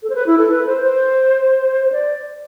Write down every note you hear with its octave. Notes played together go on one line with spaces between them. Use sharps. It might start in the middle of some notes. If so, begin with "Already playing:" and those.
A4
C5
B4
E4
A4
B4
C5
C5
C5
D5